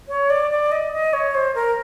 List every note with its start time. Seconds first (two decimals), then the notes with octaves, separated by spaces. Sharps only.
0.09 C#5
0.30 D5
0.51 D5
0.72 D#5
0.93 D#5
1.13 C#5
1.35 C5
1.55 A#4